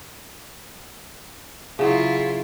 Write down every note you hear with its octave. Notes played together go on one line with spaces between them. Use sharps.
C#3 F#3 E4 F4